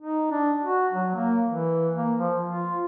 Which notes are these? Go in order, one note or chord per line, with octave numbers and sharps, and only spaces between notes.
D#4
D4
F#4
F#3
A#3
E3
A#3
F3
F4